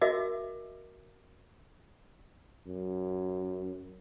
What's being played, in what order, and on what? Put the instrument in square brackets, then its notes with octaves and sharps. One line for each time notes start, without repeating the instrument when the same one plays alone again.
[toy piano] F#4 A#4 D#5 E5 D6 E6
[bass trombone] F#2